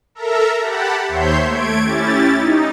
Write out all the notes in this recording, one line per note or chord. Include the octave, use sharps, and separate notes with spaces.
A4 A#4 E5 A#5
G4 F#5 A5 B5
D#2 C5 C#5 E5 C6 G6
A3 G#6 D7
C#4 E4 G4 A6
D#4